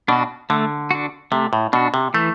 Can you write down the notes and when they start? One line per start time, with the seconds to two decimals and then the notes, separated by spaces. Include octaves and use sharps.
0.08 B2 D4 F#4
0.50 D3 A3
0.91 D4 F#4
1.32 C3 A3
1.53 A2
1.73 B2 D4 F#4
1.94 C3
2.14 E3 A3